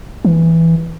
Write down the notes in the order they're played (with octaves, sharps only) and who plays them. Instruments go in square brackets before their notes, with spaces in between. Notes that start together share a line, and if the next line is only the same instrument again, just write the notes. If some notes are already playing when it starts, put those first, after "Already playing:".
[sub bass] E3